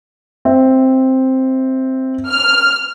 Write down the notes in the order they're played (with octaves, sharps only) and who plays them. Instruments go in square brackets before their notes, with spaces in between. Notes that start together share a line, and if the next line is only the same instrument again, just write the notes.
[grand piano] C4 E5
[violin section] F6